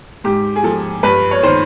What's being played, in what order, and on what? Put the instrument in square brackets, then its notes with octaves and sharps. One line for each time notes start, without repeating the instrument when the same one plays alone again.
[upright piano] G#2 G4
G#4
F3 A4
G2 B4
C#5
D#3 C5